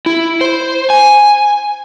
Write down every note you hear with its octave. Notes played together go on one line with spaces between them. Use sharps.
E4
C5
G#5